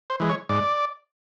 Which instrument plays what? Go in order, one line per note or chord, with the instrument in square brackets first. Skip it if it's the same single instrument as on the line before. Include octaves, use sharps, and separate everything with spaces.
[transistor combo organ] C5
E3 G#3
C#5
G#2 D5